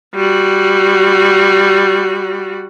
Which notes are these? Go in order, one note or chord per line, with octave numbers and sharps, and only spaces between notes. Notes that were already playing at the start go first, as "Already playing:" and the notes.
G3 F#4